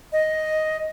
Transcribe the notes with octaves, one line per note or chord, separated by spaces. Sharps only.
D#5